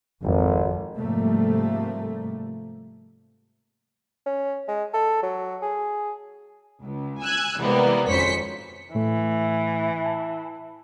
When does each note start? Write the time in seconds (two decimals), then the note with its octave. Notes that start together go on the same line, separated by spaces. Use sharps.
0.23 G#1 F2
0.98 G#2 C3 F3 G3 A3 A#3
4.26 C#4
4.68 G#3
4.94 A4
5.23 F#3
5.62 G#4
6.82 C#2
7.22 G#5 E6 F#6 G#6
7.59 C3 E3 G3 G#3 A#3 B3
8.09 G#1 F2 C#4 C5 B6 C#7
8.95 A2 E3 A3
10.06 A5